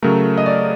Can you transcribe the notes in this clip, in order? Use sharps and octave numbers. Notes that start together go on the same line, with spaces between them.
C#3 F#3 A3 A#4
D#5
D5